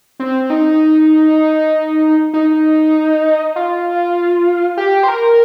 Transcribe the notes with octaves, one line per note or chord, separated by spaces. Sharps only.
C4
D#4
D#4
F4
G4
C5
A#4